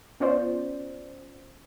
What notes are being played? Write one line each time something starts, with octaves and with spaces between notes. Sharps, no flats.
B3 C#4 F4 C5 D5